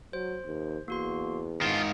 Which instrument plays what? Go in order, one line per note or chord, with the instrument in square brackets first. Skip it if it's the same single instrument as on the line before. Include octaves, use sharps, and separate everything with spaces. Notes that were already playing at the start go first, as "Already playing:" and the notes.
[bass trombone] F#3 [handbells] C5
[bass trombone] D#2
[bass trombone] E2 [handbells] A#3 F#4 C6
[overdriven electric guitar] G#2 D#3 [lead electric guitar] F4 [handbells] F5